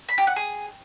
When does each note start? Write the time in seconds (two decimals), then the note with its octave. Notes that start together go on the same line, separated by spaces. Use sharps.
0.09 B5
0.18 G4
0.27 F#5
0.36 G#4